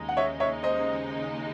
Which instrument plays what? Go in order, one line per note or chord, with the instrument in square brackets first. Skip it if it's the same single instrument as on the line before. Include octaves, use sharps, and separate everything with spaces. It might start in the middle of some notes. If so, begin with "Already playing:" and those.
Already playing: [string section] D#2 C#3 G#3 D#4
[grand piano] F#5
C#5 E5
C#5 E5
C5 D#5